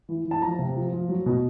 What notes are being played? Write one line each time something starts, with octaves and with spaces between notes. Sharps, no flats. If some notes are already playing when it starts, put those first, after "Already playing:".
E3
E3
A5
F3 A#5
C3
F3
F3
F#3
B2